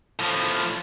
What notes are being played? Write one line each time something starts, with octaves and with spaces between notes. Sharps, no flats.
A2 F3